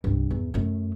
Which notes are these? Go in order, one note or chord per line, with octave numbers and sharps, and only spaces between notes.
C2 G2
E2
F#2 A3